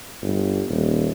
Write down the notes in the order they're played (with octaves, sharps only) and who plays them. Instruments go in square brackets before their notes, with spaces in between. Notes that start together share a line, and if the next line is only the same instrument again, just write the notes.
[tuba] G1
D#1